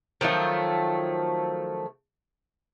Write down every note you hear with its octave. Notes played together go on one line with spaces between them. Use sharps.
D#3 F3 F#3 A3